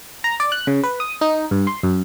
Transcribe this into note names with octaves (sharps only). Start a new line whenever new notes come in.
A#5
D5
F#6
C#3
B4
D#6
D#4
G2
C6
F#2